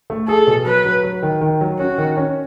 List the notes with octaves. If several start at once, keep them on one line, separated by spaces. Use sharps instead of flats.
A3
G#4 A4
B2
F#3 B4
F#3
F#3
D#3
D#3
F#3
C#4 F#4
D#3
C#4